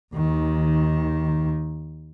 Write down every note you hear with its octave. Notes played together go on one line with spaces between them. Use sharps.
D#2 D#3